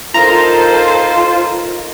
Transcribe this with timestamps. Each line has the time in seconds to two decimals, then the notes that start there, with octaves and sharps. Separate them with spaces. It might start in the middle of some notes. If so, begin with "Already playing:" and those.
0.14 D#4 F4 A4 A#4 C5 A5 A#5